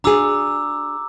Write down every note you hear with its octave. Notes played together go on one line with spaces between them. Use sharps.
D4 F#4 G#4 A#5 D6 E6